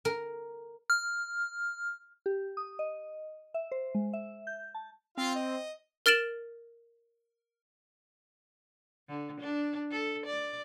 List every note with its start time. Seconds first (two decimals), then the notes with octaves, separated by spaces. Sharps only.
0.05 A#4
0.90 F6
2.26 G4
2.57 D#6
2.79 D#5
3.54 E5
3.72 C5
3.95 G#3
4.13 E5
4.47 G6
4.75 A5
5.18 C4 F4 F5
5.35 D#5
6.06 A#4 F6 A6 D7 E7 F#7
9.09 D3
9.41 D4
9.91 A4
10.26 D5